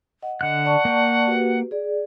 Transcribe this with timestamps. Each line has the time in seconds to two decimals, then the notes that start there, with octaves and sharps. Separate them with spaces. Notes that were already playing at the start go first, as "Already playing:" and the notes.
0.23 D#5 F#5
0.41 D3 D#5 F#5 F#6
0.65 D5 A5 C#6
0.85 A#3 G5
1.27 F#4 G4 B4
1.71 G#4 D5